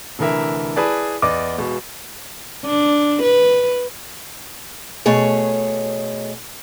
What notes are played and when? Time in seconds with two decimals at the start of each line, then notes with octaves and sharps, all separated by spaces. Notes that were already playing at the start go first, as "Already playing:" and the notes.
0.19 F1 D3 E3 A#4 E5
0.76 E4 G#4 B4 D5 A5
1.22 E2 D5 D#5 D6
1.58 E1 B2
2.66 D4
3.22 B4
5.06 B2 A3 G#4 C#5